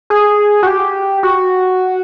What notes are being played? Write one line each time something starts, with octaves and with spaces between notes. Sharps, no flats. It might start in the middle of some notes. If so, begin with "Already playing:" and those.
G#4
F#4
G4
F#4